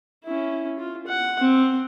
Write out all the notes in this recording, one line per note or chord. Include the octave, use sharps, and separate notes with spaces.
C#4 E4
F4
F#5
C4